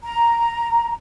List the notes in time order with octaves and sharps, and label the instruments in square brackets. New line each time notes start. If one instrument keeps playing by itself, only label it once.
[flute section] A#5